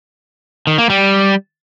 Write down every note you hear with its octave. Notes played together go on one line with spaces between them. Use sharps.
D#3
A#3
G3